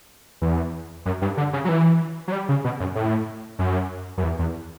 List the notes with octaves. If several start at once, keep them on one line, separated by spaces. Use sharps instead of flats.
E2
F#2
G2
D3
C#3
F#3
E3
F#3
G3
C#3
B2
F#2
A2
F#2
F#2
E2
E2